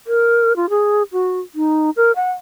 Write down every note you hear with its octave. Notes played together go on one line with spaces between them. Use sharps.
A#4
F4
G#4
F#4
D#4
A#4
F#5